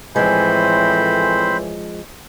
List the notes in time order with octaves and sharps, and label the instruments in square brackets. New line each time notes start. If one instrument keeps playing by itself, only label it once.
[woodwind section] A2 E3 [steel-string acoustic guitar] F3 G#3 [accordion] C4 C5 B5